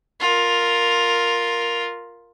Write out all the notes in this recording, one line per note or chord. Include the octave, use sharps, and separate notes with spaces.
F4 A#4